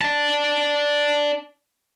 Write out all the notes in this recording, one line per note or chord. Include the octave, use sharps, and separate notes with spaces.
D5 A5